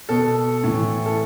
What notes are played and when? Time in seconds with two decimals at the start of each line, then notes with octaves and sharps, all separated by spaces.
0.09 B2 A4
0.63 A2 E3
1.06 A4